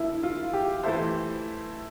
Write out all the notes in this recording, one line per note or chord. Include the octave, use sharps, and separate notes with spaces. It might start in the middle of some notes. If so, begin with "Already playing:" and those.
Already playing: D3 F3 A#3 E4
F4
G4
E3 A3 E4 A4 C5 E5